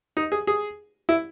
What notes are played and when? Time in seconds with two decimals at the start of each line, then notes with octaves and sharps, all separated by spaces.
0.17 D#4
0.32 G#4
0.47 G#4
1.09 E4